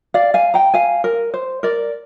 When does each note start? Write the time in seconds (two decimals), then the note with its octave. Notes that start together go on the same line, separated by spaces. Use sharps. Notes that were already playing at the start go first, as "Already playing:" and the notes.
0.14 D5 F5
0.34 F5 G#5
0.54 G5 A#5
0.74 F5 G#5
1.04 A#4
1.34 C5
1.63 A#4 D5